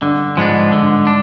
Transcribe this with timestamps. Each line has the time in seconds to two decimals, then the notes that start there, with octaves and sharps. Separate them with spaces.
0.01 G2 D3
0.37 G#2 F3 G#3 B3 D4
0.72 G#2 D3
1.07 D4